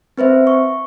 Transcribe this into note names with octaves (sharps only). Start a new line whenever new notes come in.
C4 B4 C5 E5
C#6